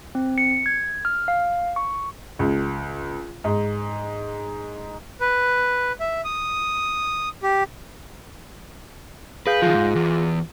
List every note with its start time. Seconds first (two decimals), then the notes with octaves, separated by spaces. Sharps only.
0.15 C4
0.38 C#7
0.66 G#6
1.05 F6
1.28 F5
1.76 C#6
2.39 C#2
3.44 G#2
5.21 B4
6.00 E5
6.25 D#6
7.43 G4
9.47 G#4 B4 F5 G6
9.62 D#3 F3 F4 G#4
9.74 G#2
9.96 E2